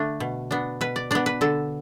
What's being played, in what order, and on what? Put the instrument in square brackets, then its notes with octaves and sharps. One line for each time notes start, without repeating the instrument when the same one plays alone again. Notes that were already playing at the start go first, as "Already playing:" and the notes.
Already playing: [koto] D3 A3 D4
B2
B3 D4
B2 B4
D5
B3 D4 D5
B4
D3 A4